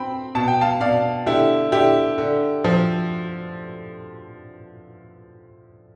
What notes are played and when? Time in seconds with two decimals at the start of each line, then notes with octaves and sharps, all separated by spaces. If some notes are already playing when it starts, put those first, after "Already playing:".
Already playing: C4 G5 B5
0.35 B2 A5
0.48 G5
0.61 F5 A5
0.81 B2 D5 F5
1.26 D3 E4 G4
1.72 D3 E4 G4
2.18 D3
2.64 F3